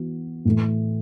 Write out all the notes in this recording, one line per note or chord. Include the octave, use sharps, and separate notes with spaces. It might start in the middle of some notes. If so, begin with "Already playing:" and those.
Already playing: E3 B3 F#4
A2 E3 A3